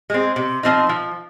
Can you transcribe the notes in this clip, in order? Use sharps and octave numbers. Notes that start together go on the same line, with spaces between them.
G#3 C4
C3
F3 C4 D#4
F3